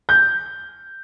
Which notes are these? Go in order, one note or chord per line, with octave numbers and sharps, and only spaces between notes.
G6